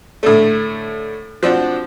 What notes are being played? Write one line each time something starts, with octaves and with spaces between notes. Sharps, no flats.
A2 D3 A3
F3 C4 D4 F#4